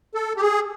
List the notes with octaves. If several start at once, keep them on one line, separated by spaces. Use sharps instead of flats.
A4
G4
G#4